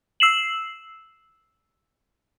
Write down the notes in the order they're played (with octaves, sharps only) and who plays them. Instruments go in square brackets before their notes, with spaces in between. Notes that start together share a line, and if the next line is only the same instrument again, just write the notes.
[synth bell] E6 C7 E7 F#7